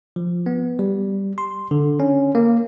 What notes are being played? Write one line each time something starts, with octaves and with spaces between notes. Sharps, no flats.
F3
B3
G3
C6
D3
C#4
A#3